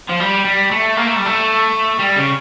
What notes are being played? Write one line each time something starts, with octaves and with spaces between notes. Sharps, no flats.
F3
G3
G3
A3
A#3
A3
G3
A3
G3
C#3